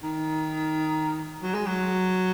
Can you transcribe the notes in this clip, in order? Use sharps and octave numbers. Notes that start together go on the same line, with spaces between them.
D#3
F#3
G#3
F#3